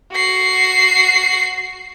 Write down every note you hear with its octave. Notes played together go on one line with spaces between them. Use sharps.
F#4 C7